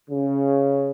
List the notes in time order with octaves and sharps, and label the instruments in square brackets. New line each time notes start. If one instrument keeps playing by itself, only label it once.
[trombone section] C#3